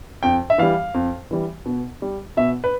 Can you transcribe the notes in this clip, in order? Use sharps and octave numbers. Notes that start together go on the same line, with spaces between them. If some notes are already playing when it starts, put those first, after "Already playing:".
F2 G5
E5
E3 G3 F5
F2
E3 G3
B2
G3
B2 E5
B4